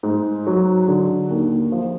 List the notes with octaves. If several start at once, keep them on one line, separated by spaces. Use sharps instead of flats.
G#2
F#3
D3
D#2
F3